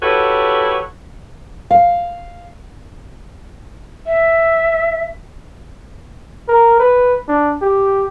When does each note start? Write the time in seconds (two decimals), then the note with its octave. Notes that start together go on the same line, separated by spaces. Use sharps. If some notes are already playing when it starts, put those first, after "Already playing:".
0.03 E4 F#4 G4 A4 B4 C#5
1.71 F5
4.07 E5
6.48 A#4
6.80 B4
7.28 D4
7.62 G4